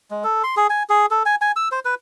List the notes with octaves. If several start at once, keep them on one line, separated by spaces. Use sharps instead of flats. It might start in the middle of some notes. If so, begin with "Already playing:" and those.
G#3
A4
C6
G#4
G#5
G#4
A4
G#5
G#5
E6
C5
B4